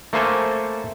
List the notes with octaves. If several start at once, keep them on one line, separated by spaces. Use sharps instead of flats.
A3 A#3 A4 C5 G#5